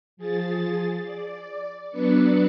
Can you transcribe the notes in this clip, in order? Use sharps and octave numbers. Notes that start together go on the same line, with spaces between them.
F3 G#4 A6
D5
F#3 B3 D4 B4 D5 C#7